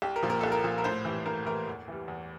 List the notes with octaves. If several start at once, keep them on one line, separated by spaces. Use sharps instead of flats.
C2 G4
A#4
A#2 F3
A#4
C2 A4
A#4
A#2 F3
A#4
A2 C5
E3 G3
A2 A#4
E3 G3 A#4
E2
E3 G3
E2